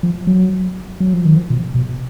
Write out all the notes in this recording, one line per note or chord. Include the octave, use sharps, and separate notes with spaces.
F3
F#3
F#3
F3
D#3
F3
B2
B2